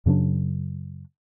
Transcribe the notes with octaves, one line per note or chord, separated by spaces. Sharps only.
F#2 C#3 F#3 D4